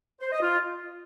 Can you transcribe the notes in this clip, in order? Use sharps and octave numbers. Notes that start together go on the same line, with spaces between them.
C5
D#5
F4